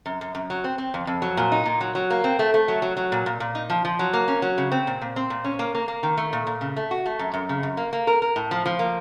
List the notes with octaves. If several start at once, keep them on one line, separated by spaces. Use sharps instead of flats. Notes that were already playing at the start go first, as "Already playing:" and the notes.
F#2
F#2
F#2
F#3
C4
C4
F2
F2
F#3
A#2
D#4
A#2
F#3
F#3
A#3
C4
A3
A3
F#3
F#3
F#3
A#2
A#2
A#2
D#4
F3
F3
F#3
A#3
C#4
F#3
C#3
C4
A#2
A#2
C4
A#2
C#4
A#3
A#3
A#3
D#3
A3
A#2
A#2
C#3
A3
F#4
A3
F#2
F#2
C#3
F#2
A#3
A#3
A#4
A#4
A2
F3
F3
A#3